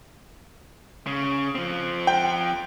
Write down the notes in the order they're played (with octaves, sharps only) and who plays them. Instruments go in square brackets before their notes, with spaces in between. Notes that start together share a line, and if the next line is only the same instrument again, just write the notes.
[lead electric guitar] C#3
F3 C4
[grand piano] G5